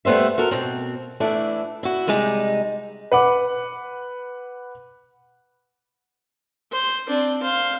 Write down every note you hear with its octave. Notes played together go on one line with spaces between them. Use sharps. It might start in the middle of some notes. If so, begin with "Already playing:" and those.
G3 A3 B3 C5 E5
F#4 A4 A#4
B2 C4
E3 A3 D4 E4
E4 F#4
C3 G3 G#3 D#4
B4 F#5 D6
C5
C4 D4
C5 F5